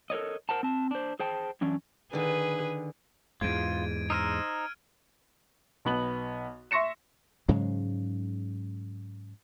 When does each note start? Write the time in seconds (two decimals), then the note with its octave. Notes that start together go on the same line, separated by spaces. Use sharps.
0.10 A4 A#4 C#5 D#5
0.49 A#4 C5 F#5 A5
0.63 C4 A5
0.91 D4 C5
1.20 G#4 C5 G5 A5
1.61 F#2 E3 C#4 D4
2.13 D3 D#3 G#4 B4
3.41 E2 G#2 F4 G#6 D7 D#7
4.10 D#4 C5 A#5 E6 F6 D#7
5.85 B1 B3 F#7
6.71 E5 C6 C#6 A#6 C#7 E7
7.48 G#2 C#3 F#3 G#3